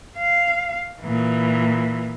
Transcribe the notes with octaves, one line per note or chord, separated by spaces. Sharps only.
F5
A#2 E3